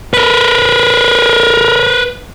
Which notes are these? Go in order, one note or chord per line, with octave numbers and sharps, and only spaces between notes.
A#4 B4